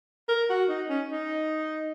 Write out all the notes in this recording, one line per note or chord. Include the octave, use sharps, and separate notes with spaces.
A#4
F#4
D#4
C#4
D#4